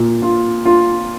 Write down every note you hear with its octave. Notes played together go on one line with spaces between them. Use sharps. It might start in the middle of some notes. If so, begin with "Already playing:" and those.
Already playing: A#2
F4
F4